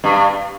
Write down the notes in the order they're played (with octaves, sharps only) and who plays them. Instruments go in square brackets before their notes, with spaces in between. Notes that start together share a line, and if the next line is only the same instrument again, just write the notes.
[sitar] G2